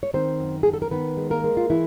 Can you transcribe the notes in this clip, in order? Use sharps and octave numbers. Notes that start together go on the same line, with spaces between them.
C#5
D#3 C4 C5
F#2
D#3 G#4
A4
A#4
D#3 B3 B4
G#3
A#3 A#4
G#3
F4
E3 E4